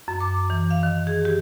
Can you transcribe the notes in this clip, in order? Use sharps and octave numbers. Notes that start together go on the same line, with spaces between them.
F#2
D6
E3
F5
D#3
G#4
G4